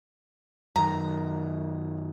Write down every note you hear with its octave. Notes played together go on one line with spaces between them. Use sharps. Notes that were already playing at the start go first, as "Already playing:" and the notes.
F#2 D#3 A#5